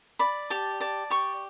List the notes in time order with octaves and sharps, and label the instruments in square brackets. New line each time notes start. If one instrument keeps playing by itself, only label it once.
[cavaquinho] D5 B5
G4 A5
D5 A5
G4 C#6